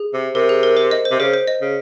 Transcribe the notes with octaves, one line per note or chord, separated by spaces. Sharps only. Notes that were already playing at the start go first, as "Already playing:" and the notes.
Already playing: G#4
C3
C3 A#4
G#4
A#4
C5
D#5
C5
C3
C#3 C5
C5
D#5
C#3